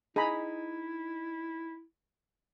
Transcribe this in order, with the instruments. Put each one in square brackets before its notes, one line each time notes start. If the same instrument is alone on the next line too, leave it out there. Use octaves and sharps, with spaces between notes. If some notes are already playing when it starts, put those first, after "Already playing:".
[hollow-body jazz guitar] D#4 [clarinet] E4 [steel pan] G#4 A#5 B5